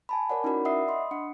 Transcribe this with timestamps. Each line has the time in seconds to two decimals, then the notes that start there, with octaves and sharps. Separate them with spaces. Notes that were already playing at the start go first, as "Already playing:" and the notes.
0.09 G#5 A5 B5
0.30 A#4 C#5 D5 F#5
0.44 C#4 D#4 E4 F#4 A#4 B5
0.65 D5 E5 F#5 D#6 E6 C7
0.88 D#5 B5 C6 D#6
1.11 D4 F#5 C#7